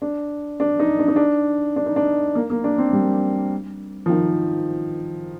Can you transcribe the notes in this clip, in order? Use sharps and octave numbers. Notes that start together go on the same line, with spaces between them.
D4
D4
D#4
D4
D#4
D4
D4
D#4
D4
A#3
A#3
D4
C4
G3
F3
D#3